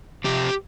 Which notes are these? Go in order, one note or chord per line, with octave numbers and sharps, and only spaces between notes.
C3 F3 G4